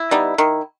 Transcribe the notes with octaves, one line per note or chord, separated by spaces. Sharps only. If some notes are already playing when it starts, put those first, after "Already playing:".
Already playing: E4
G3 B3 D#4
D#3